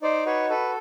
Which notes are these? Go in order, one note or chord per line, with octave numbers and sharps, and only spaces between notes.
D#4 C5 D5
F#4 B4 C#5
A4 B4